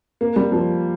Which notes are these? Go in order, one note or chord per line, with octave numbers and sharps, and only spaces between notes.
A#3
G3
F3